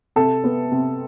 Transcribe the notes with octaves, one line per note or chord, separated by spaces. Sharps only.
C3 A4
B3
C3